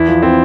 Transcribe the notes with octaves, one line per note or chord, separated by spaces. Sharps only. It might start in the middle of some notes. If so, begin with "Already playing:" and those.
Already playing: E2 E4
F3
C4